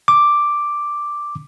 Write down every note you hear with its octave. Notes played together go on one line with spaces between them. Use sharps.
D6